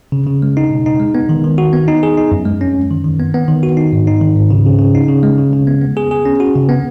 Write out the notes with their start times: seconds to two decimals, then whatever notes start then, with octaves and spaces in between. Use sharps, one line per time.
0.12 C#3
0.27 C#3
0.42 G#3
0.57 D#4
0.71 B2
0.86 D#4
1.00 G#3
1.15 B3
1.29 D#3
1.44 D#3
1.58 F#4
1.73 B3
1.88 D#4
2.03 G#4
2.18 D#4
2.32 F#2
2.46 G#3
2.61 C#4
2.75 F#2
2.91 D#3
3.04 D#3
3.20 B3
3.34 B3
3.48 D#3
3.63 F#4
3.77 D#4
3.93 G#2
4.07 D#4
4.22 D#3
4.36 G#2
4.51 C#3
4.66 C#3
4.79 C#3
4.95 D#4
5.08 C#3
5.23 G#3
5.38 C#3
5.53 C#3
5.67 B3
5.81 B3
5.97 G#4
6.11 G#4
6.26 C#4
6.40 F#4
6.55 C#3
6.69 B3